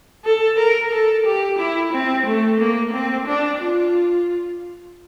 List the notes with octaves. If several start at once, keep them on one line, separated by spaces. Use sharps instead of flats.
A4
A#4
A4
G4
E4
C4
A3
A#3
C4
D4
F4